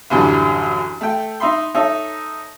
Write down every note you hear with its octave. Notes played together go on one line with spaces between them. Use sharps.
A1 F#2 D3 E3 G3
A3 G5
D#4 E5 B5 C6
D#4 A4 C#5 E5